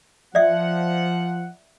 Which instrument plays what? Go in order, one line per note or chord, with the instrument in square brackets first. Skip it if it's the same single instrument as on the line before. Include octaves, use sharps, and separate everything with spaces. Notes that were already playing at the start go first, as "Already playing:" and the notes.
[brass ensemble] F3 F#5 [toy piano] D5 E5